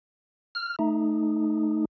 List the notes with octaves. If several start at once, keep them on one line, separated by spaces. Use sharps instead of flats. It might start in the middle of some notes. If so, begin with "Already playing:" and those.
F6
A3 D#4